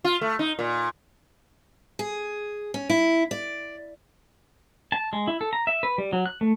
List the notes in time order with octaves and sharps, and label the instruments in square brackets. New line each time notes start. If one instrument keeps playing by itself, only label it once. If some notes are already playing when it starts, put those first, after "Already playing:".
[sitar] F4
A3
D#4
A#2
[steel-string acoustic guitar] G#4
C#4
E4
D5
[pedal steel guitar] A5
G#3
E4
A4
A#5
E5
B4
G3
F#3
F#6
A3